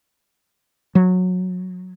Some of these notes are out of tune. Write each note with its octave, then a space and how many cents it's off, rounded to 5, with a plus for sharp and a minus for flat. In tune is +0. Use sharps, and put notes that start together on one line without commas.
F#3 -20